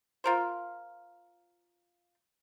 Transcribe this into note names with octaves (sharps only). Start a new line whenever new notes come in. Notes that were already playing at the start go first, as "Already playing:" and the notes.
F4 A#4 C5